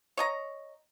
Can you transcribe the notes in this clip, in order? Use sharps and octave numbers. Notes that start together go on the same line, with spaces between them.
C#5 D#5 A#5